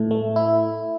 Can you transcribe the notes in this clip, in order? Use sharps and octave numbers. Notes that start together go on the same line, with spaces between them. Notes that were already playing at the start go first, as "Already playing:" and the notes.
Already playing: A2 A3
A3
E4